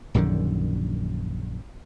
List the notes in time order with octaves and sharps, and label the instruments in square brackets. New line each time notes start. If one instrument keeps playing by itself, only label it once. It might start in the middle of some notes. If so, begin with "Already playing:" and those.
[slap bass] A#1 F#2 D3 D#3